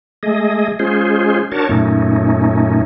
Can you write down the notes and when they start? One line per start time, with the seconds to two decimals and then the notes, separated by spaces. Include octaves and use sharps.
0.23 G#3 A3 G#4 D#5
0.79 G#3 C#4 F4 G#4 C5
1.52 D4 F#4 A#4 C#5 A5
1.69 F#2 A#2 A3 C#4 D#4